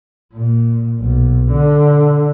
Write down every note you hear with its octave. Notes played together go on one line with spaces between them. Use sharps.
A#2
B1
D3